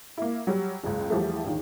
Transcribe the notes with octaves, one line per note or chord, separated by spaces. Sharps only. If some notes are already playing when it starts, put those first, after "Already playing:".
A#3 E4
F#3 G3
F#1 C#2
E2 E3 F3 G3 A3
A#1 D#2 D#3